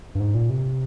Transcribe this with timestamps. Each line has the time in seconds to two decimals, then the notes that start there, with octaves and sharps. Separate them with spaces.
0.15 G2
0.20 G#2
0.35 A#2
0.50 C3